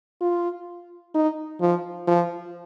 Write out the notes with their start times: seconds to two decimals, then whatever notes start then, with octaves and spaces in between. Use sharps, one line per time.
0.21 F4
1.15 D#4
1.61 F3
2.07 F3